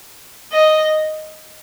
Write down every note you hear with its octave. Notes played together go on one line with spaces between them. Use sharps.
D#5